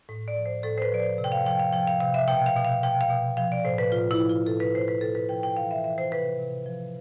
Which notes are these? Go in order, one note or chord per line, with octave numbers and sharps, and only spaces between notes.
A2
D5
F3
C5
A2 A4
C5
B4
F3 D5
C5
C3
G5
F5
F3 G5
F5
F3 G5
F5
C3 F5
E5
B2 G5
F5
B2
F5
B2 G5
F5
B2
F3 F5
D5
A2 C5
B4
A2 F4
E4
F3
F4
A2 A4
B4
A2 C5
B4
A2 A4
B4
F3 G5
G5
E3 F5
E5
E3 E5
C5
C3 B4
C3
F3